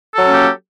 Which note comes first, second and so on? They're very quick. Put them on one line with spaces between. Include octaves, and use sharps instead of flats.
A4 F#3 C#4 A#3 G4